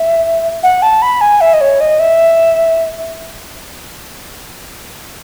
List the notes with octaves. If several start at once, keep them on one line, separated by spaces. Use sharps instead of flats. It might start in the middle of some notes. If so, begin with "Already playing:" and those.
Already playing: E5
F#5
A5
B5
G#5
E5
D#5
C#5
D#5
E5